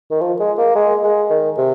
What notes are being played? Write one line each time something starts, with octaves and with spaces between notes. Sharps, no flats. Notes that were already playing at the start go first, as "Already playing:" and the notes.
D#3
F3
G#3
A#3
G#3
G#3
D#3
C3